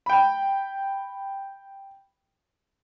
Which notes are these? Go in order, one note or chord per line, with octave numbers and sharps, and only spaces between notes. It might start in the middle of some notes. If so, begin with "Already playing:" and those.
G5 B5